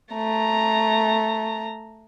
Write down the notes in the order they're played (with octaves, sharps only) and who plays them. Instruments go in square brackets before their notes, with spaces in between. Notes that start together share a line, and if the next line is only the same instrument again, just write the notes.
[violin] A3 A#5